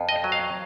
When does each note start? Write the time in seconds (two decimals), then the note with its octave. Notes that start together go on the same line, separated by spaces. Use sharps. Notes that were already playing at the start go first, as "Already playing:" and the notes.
Already playing: F2
0.09 D#5
0.24 F#3
0.32 F5